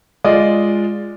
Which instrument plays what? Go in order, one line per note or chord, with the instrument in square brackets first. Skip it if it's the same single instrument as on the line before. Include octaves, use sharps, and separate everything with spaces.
[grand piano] G#3 F4 D5 D#5